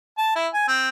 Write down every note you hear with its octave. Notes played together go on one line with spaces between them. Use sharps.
A5
E4
G#5
C4